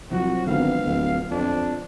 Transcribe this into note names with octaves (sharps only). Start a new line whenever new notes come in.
C2 C3 F3 F#3 F#4
G#1 D3 B3 F5
D1
F2 D4